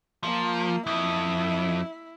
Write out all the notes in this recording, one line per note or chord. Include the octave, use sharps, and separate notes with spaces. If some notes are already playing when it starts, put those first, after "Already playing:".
F3 A#3
F2 E4